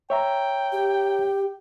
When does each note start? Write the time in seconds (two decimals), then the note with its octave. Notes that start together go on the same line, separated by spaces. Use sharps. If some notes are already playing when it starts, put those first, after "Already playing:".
0.10 C#5 E5 G5 A#5
0.72 G4